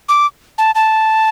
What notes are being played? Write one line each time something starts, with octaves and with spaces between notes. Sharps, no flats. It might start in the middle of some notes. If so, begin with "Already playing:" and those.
D6
A5
A5